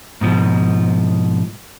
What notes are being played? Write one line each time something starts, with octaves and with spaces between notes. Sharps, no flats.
G#2 B2 F3